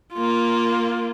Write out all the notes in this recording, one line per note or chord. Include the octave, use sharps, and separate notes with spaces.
A#3 F4